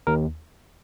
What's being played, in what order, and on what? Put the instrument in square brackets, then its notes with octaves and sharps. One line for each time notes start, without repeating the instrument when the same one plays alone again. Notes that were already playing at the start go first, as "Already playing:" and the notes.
[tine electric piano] D#2 A#4